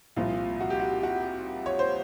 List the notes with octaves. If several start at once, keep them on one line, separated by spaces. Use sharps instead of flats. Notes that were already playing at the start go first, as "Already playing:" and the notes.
C2 A#2 F3 F4
F#4
G4
F#4
F#4
C#5
C5